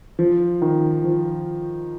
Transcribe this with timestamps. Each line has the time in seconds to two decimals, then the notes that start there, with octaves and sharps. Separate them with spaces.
0.19 F3
0.62 D#3
1.04 F3